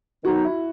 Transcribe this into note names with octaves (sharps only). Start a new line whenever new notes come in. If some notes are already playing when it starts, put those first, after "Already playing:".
D#3 F#3 B3 D#4 F#4
E4